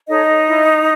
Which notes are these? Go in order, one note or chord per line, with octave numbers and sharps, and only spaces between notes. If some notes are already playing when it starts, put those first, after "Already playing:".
D#4 A4 C#5 D#5
E4